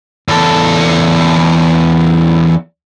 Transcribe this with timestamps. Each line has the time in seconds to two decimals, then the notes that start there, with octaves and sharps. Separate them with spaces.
0.28 E2 A4